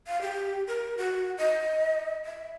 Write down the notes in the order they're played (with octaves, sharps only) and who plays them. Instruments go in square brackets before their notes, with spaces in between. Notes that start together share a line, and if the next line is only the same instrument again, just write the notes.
[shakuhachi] F5
G4
A#4
F#4
D#5
E5